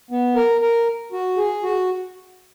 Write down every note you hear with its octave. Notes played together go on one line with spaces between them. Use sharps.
B3
A#4
A#4
F#4
G#4
F#4